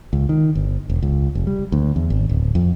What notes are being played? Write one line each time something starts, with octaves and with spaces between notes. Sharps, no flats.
C#2
D#3
G1
E1
C#2
F1
G3
D2
E2
G#1
D1
F2